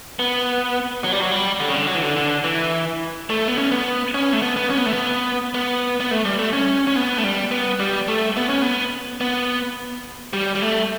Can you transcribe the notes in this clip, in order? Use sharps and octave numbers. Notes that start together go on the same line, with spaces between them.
B3
F#3
G3
F#3
G3
D3
C#3
D3
F#3
E3
D3
D3
E3
A3
B3
C#4
B3
C#4
A3
B3
B3
C#4
B3
A3
B3
B3
B3
A3
G3
A3
C#4
C#4
B3
A3
G3
B3
G3
A3
B3
C#4
B3
B3
G3
G3
A3